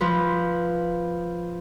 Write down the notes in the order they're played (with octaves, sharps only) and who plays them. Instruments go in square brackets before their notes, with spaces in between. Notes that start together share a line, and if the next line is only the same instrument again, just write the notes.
[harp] F3 B4